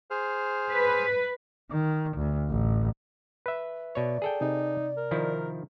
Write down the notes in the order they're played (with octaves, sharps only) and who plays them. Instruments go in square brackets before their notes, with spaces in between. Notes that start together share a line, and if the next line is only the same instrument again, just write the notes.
[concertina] G#4 C5 F6
[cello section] B4
[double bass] D#3
D2
A1
[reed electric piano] B4 E5
[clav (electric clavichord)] B2 C#5 [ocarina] D5
[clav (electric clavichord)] G#4 A4 G5
[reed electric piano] C3 [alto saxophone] D#4
[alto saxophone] A#4
[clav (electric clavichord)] D#3 F3 E4